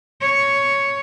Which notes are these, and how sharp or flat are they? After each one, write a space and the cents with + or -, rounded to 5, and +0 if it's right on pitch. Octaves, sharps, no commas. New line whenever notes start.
C#5 +5